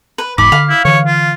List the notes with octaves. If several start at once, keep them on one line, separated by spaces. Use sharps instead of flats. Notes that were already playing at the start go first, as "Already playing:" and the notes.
B4
E1 G#2 B5 D6
D3 F5
E4
D3 E3 C#5
F4